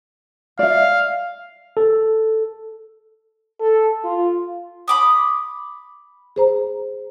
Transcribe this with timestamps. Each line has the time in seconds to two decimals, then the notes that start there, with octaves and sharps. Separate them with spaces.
0.59 D5 E5 F5
1.77 A4
3.60 A4
4.04 F4
4.88 B5 D6 D#6
6.36 G#4 C5 A#5